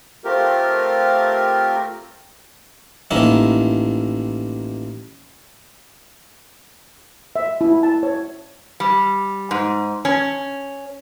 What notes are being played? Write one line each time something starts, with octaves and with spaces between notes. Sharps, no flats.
A3 C4 F4 G4 A#4
A1 D#3 A#3 E4
E5
E4
A5
C#5
G3
G#2
C#4